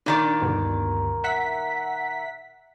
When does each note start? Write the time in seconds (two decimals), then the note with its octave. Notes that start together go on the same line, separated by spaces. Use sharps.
0.06 A#2 D#3 D4 D5
0.42 D2 G2 B2
1.24 E5 F#5 B6